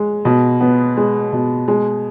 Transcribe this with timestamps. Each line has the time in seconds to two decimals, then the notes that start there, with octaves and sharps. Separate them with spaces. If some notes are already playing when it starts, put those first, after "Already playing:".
Already playing: G#3
0.25 B2
0.61 B3
0.97 G#3
1.33 B2
1.68 G#3